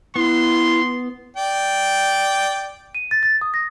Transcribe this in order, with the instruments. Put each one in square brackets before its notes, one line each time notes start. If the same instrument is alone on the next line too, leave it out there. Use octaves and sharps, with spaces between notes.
[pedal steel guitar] B3 [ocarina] E4 [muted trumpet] C6
[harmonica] D5 G5
[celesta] D#7
A6
A6
D#6
A#6